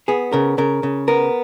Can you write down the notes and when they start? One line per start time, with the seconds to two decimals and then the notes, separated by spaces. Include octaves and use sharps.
0.08 B3 G#4
0.33 C#3 A#4
0.58 C#3 A#4
0.83 C#3
1.08 B3 A#4